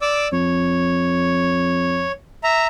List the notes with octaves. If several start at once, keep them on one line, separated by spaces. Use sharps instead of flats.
D5 D6 E6
F2 C#5
E5 A#5